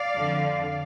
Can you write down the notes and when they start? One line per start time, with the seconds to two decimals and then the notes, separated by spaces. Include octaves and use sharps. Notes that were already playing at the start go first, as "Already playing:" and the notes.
Already playing: D5 F5
0.16 F2 D3